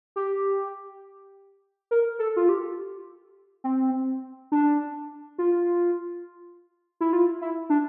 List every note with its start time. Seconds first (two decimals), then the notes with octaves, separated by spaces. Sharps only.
0.16 G4
1.91 A#4
2.19 A4
2.36 F4
2.49 G4
3.64 C4
4.52 D4
5.38 F4
7.01 E4
7.13 F4
7.41 E4
7.70 D4